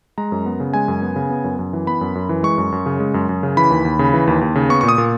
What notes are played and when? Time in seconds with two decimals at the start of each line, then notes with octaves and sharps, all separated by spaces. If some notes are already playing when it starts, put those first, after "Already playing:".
0.18 G#3 A#5
0.32 F#2
0.46 B3
0.60 C#3
0.74 G#3 G#5
0.88 F#2
1.02 B3
1.16 C#3
1.30 B3
1.44 F#2
1.59 F#2
1.73 E3
1.87 B3 B5
2.01 F#2
2.15 F#2
2.29 E3
2.43 G#3 C#6
2.58 F#2
2.72 F#2
2.86 C#3
3.00 G#3
3.14 F#2
3.29 F#2
3.43 C#3
3.57 E3 B5
3.71 D#2
3.85 D#2
3.99 C#3
4.13 E3
4.27 D#2
4.41 D#2
4.55 C#3
4.69 B3 C#6
4.81 A#2 C#6
4.89 D#6
4.98 A#2